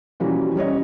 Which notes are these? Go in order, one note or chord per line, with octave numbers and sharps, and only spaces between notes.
B2 E3 F3 G3 A#3 C#4
G3 C#4 C#5 D#5